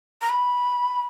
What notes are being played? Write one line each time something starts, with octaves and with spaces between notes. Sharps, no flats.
A#5
B5